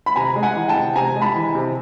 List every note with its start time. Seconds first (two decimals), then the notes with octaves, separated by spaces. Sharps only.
0.06 B5
0.16 C3 G#5 A#5
0.36 G#3
0.43 F#5 G#5
0.56 E3
0.68 G5 A5
0.76 C3
0.95 C3 G#5 A#5
1.16 G#3
1.22 A5 B5
1.36 E3
1.55 C3